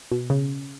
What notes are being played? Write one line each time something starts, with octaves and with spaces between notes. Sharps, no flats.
B2
C#3